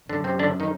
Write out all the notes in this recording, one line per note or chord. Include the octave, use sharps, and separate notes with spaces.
F#2 D3 D4
C3 C4
D3 D4
D#3 D#4